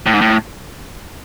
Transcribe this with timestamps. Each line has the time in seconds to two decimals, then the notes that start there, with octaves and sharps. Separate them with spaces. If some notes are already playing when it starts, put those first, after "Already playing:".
0.06 A2
0.14 G#2
0.21 A2